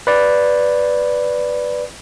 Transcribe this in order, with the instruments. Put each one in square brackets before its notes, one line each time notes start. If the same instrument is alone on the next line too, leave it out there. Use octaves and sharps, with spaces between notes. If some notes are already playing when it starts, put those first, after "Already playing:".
[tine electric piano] B4 D5